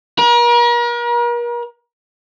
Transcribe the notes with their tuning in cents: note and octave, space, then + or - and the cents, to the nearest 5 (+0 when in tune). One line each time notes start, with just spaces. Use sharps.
A#4 +40